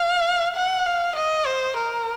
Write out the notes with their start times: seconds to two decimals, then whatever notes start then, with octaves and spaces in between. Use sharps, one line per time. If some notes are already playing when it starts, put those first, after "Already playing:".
Already playing: F5
0.56 F#5
0.86 F5
1.16 D#5
1.46 C5
1.77 A#4